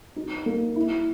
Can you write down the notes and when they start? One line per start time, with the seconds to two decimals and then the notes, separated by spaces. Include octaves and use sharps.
0.16 D#4
0.46 A#3
0.76 E4